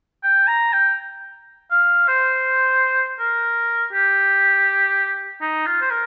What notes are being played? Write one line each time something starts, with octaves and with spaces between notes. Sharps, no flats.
G5
A#5
G5
F5
C5
A#4
G4
D#4
F4
C5
A#4